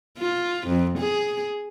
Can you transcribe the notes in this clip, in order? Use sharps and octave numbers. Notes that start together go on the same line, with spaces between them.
F4
F2
G#4